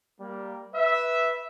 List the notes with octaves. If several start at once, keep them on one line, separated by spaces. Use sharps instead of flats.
G3 A#3
B4 E5